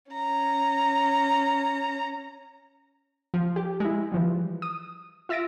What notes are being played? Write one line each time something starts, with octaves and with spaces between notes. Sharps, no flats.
C#4 A#5
F3
G4
G#3 E4
E3 F3 G3
D#6
F4 E5 E6 A6 A#6 D7